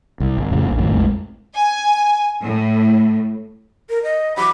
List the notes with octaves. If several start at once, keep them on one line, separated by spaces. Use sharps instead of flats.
C2
G#1
F2 A2 C#3
D#1 A#1
F#2 A2 D#3
A#1 F2 G#3 A3
G#5
A2
A#4
D#5
E3 F#3 G4 B5